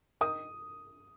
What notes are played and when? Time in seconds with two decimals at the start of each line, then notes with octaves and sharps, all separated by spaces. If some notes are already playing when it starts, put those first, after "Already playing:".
0.21 D#3 D#6